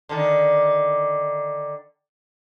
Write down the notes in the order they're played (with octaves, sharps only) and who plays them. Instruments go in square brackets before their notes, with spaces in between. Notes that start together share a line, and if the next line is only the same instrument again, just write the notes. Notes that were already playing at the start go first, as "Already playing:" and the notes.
[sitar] D3 D#3